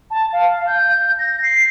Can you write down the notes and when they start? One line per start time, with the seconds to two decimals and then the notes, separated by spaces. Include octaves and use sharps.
0.11 A5
0.33 F5
0.67 G6
1.19 A#6
1.43 C7